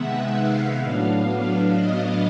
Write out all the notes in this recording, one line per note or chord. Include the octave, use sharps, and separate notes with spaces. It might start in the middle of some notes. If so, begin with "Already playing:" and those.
Already playing: C3 D#3 G#3 B3 E5 F#5
F5
A2 F#3 B3 D4
D#5